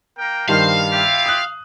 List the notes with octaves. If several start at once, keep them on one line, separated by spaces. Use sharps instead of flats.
A#3 A#4 G5
G2 D#3 C5 F5
E4 F4 G4
D#6 F#6